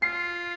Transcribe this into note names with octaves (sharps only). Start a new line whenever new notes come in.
F4 C7